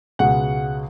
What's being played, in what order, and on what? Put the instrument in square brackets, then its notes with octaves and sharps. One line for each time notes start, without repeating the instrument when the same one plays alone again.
[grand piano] C#2 B2 G#3 F#5